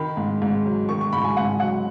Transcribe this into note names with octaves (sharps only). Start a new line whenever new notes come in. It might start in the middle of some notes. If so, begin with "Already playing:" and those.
Already playing: D#3 B5
G#2
G#2
F#3
D#3 C#6
C#6
G#2 B5
G#5
G#2 F#5
F#3 F#5